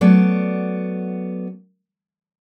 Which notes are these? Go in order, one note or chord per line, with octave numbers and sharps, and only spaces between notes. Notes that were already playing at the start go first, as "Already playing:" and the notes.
F#3 A3 B3 D5